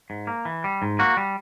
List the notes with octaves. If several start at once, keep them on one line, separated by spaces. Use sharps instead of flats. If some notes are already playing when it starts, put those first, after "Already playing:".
G#2
A#3
E3
G3
G#2
A#3 F#4
G3